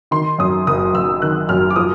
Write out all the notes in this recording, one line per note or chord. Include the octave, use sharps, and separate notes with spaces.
D#3 C6
F#2 D#6
F#1 D#6
F#1 E6
D#3 F#6
F#2 F6
D6
F3 D#6